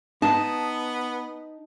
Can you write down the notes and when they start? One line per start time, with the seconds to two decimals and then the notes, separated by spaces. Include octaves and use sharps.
0.22 B3 D#4 A5